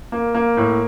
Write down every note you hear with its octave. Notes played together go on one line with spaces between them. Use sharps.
A#3
A#3
A2